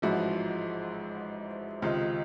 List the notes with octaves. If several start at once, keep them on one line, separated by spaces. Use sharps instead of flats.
A1 G#2 F3 E4 F#4
C#2 C3 D#3 D#4 F4